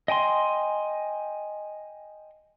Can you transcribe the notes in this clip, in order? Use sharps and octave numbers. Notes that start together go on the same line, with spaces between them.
D#5 G5 G#5 C6